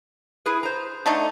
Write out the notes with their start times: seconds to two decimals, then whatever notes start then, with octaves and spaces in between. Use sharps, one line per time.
0.46 E4 G#4 B4
0.63 C5 A#5
1.06 D3 A3 D#4